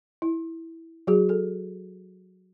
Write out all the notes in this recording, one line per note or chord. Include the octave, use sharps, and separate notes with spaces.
E4
F#3 F#4 G#4
A4